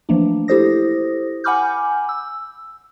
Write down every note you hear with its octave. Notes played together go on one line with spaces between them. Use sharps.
E3 F3 A3 A#3 D4
E4 G4 A4 C5 D#6 A#6
F#5 G#5 B5 D6 F6 G6
E6